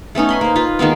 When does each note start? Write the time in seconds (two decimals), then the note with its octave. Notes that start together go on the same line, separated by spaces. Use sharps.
0.15 A3 B3 C#4 D#4
0.29 G#5 B5 C6
0.41 A#3 C5
0.56 F4 B4
0.79 D#3 G#3 A#3 B3